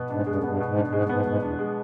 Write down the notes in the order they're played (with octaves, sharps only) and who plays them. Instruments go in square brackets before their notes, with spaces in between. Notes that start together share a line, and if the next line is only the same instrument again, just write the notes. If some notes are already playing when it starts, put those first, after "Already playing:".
Already playing: [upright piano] B2 B3
[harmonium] G#2 [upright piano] D4
[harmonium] G2 [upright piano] G#3
[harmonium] F#2
[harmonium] G2 [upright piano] B3
[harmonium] G#2 [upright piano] B2
[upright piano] D4
[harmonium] G#2
[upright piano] G#3
[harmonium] G2
[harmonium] G#2 [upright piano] B3
[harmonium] G#2 [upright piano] B2
[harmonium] E2 [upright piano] D4
[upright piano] G#3